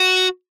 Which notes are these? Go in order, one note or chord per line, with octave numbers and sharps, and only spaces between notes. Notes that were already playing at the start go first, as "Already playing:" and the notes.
Already playing: F#4